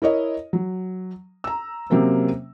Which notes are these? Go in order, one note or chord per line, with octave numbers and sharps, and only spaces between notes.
E4 A#4 C#5 D#5
F#3
A#5 E6
C3 F#3 A#3 C4 C#4